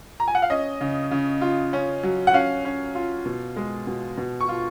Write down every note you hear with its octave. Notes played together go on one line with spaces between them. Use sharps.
A#5
G#5
F#5
F5
C#4 D#5
C#3
C#3
F4
C#4
F#3
F#5
C#4 F5
C#4
F4
B2
G#3
B2
B2
C#6
F4